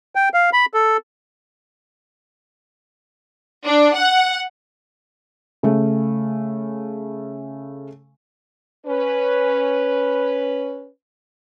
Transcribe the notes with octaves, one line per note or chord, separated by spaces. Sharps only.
G5
F5
B5
A4
D4
F#5
C#3 A3
C#4 B4